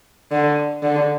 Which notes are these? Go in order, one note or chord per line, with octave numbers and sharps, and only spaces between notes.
D3
D3